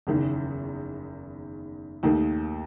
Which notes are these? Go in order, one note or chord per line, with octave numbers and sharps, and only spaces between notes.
F#1 E2 D#3
D#2 D#3 A3